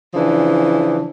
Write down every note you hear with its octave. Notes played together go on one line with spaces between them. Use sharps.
C#3 E3 F3 D4